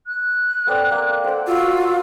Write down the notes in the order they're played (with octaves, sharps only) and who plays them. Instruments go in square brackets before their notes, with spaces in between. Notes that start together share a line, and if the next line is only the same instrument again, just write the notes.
[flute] F#6
[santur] B3 C4 D5 [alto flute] A4
[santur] A#3
[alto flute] A4 [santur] C5 F#5 [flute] G5
[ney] F4 [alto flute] F#4 [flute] E6